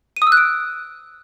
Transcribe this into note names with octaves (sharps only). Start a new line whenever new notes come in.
D#7
D#6
E6
F#6
D7